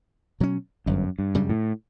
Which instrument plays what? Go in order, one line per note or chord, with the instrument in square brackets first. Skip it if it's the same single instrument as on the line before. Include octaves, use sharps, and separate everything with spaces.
[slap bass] B2 F#3 C#4
[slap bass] G1 [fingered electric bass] F#2
[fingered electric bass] G2
[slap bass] F#2 C#3 G3
[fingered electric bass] A2